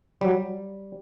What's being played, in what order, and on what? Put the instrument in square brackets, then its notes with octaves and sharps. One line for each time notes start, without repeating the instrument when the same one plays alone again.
[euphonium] F#3 [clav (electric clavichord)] G3